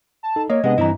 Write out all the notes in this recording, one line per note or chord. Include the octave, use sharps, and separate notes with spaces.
A5
D#4 A4
A#3 C#5 D#5
C3 G#3 B3 D4 D#5
G2 E3 C4 E4 A#5